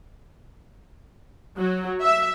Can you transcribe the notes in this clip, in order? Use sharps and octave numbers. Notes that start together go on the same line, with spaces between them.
F#3
E5